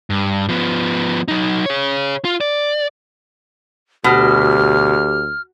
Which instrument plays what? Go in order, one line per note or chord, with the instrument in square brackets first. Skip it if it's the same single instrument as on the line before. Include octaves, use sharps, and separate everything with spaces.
[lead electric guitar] G2
F3 B3
F#3 D#4
G#4 C#5
F4
D5
[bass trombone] D2 [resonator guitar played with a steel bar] B2 [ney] G4 [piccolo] F6